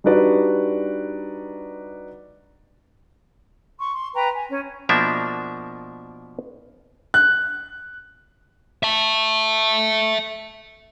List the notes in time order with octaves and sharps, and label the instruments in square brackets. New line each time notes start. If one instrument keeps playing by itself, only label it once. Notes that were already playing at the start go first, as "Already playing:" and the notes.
[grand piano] G3 D4 D#4 F#4 B4 D5
[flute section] C6 C#6
C6
B4 G5 A#5
G#5
C#4
[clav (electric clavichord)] B2 F3 A#3 D4 A#4 E5
[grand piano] F#6
[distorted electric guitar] E5 A5